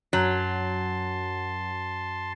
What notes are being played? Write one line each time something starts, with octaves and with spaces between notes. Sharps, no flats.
F#2 F#3 A5 C6 G6